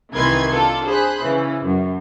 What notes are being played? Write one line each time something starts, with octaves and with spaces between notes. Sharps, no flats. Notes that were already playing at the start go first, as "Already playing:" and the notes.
C2 D#3 E3 B4 C6 G#6
D4 F4 A4
G#4 C5 B5 F#6
C#3 E3 C#4
F#2